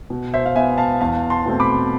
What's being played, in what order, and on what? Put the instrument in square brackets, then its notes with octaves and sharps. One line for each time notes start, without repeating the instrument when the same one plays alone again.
[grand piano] B2
C5 E5
F5
B3 E5 G#5
F5 A5
E2 F5 A5
A5 C6
B2 A3 C4
B5 D6